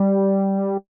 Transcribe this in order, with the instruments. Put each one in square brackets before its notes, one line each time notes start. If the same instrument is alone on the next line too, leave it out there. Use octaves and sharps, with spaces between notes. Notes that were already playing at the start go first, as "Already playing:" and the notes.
Already playing: [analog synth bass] G3